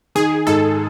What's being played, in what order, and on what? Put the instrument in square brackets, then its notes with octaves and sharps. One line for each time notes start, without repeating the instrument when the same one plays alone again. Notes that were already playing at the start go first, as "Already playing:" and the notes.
[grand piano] D#3 [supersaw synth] G#4
[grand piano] G#2 [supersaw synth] A4